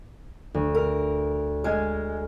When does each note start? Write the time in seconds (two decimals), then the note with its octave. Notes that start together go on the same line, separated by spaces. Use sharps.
0.54 D2
0.75 A#4
1.64 G#3 G#5 F6